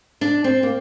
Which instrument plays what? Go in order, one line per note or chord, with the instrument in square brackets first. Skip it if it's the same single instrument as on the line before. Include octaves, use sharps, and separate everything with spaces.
[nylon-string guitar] D4
C4
A#3